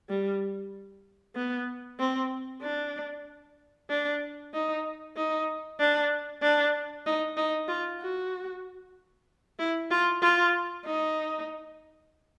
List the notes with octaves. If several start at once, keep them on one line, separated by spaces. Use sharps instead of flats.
G3
B3
C4
D4
D4
D#4
D#4
D4
D4
D#4
D#4
F4
F#4
E4
F4
F4
D#4